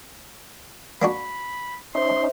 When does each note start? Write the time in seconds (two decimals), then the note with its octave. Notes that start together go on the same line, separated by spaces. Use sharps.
1.02 A#3 D4 F#4 B5
1.95 C#4 D#4 C5 E5 C6